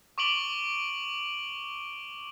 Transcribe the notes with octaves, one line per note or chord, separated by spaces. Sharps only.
C#6 D6 D7 F#7 G7